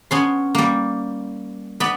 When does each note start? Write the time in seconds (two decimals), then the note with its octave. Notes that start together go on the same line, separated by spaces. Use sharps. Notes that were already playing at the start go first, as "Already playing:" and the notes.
0.11 B3 C#4 C6
0.55 G3 A#3
1.80 B3 D5 B5